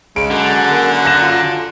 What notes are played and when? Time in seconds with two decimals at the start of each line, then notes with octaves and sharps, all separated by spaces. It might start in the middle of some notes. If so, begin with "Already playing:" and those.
0.16 C#3 G#3 D7
0.30 F#2 D3
0.71 A#3
1.05 F#6 A#6 E7
1.22 F4